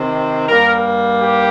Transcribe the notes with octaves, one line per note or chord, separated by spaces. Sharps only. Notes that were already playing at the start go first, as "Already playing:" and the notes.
Already playing: C3 D#3 C4
G2 G3 A#3 A#4
G4